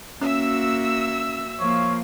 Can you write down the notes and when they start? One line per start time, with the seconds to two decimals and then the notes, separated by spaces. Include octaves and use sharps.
0.21 A#3 C#4 F#4 E5 E6
1.60 F3 A#3 C#5